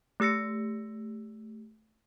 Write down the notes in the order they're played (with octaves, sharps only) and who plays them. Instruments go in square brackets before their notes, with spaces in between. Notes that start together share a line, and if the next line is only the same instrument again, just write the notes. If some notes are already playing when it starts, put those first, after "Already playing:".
[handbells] A3 G4 E6 A#6 C#7